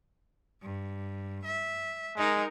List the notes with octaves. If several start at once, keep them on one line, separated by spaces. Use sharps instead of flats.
G2
E5
G#3 D#4 A#4